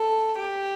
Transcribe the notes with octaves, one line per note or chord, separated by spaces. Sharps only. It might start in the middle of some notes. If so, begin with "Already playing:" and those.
Already playing: A4
G4